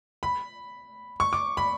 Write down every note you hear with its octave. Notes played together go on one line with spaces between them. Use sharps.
B5
C#6
D6
B5